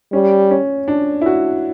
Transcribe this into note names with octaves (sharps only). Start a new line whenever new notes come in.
G3 C#4
C#4
D4
E4
F#4